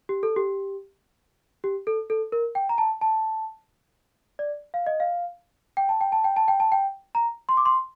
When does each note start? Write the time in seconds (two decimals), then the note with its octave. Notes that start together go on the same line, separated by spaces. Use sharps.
0.09 G4
0.23 A4
0.36 G4
1.64 G4
1.87 A4
2.10 A4
2.32 A#4
2.55 G5
2.69 A#5
2.78 A5
3.01 A5
4.39 D5
4.74 F5
4.87 D#5
5.00 F5
5.77 G5
5.89 A5
6.01 G5
6.12 A5
6.24 G5
6.36 A5
6.48 G5
6.60 A5
6.72 G5
7.15 A#5
7.49 C6
7.57 D6
7.66 C6